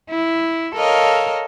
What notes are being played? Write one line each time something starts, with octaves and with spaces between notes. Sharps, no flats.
E4
A4 A#4 C#5 D#5 F5